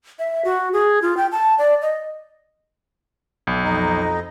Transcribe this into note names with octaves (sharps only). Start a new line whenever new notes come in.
E5
F#4
G#4
F4
G5
A5
D5
D#5
B1
F2 D#4 D#5